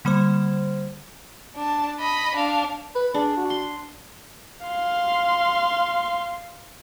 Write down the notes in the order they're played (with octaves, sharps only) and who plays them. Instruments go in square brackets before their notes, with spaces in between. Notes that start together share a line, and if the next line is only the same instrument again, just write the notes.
[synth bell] D3 G3 A#3 C5
[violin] D4 A5
D#5 B5
D4 F5
[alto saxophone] B4
[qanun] D4 [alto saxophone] G#4
[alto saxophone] F#4
[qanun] C6
[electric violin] F5 C6